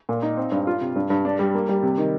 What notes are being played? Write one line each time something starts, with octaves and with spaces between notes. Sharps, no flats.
A#2
D#4
C4
G2
F4
C3
G2
G2
D4
G3
A#3
G3
C3
D#3